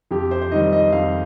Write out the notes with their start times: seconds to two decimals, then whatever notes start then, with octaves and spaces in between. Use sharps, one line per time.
0.11 F2 G4
0.31 C5
0.42 C5
0.51 D#3 G3 D#5
0.72 D#5
0.92 F2 F5